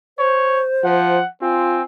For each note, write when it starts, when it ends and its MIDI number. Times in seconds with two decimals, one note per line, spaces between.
0.19 1.19 72
0.19 0.62 73
0.84 1.19 53
0.84 1.29 78
1.42 1.82 60
1.42 1.82 65
1.42 1.84 80